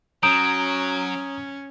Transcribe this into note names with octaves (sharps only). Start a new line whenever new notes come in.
F#3 C#4 A#5 D#6 G6 D7